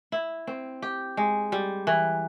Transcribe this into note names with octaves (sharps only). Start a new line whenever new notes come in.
E4
C4
G4
G#3
G3
E3